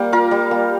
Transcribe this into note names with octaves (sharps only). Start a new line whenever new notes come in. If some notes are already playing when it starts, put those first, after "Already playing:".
Already playing: G3 A#3 G4
F4 A#4
G3
A#3